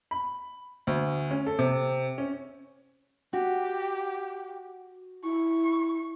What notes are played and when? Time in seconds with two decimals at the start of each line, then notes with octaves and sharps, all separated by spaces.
0.11 B5
0.87 D2
1.31 C#4
1.46 A4
1.59 C3
2.18 C#4
3.34 F#4 G4
5.24 E4 C#6